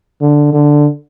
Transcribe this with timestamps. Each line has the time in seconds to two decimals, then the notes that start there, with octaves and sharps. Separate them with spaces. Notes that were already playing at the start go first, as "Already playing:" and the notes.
0.21 D3
0.53 D3